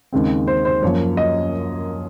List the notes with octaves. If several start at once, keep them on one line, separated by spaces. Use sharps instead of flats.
D#2 C#3 G#3 C4
C5
C5
F#2 F3 A#3 C#5
D#5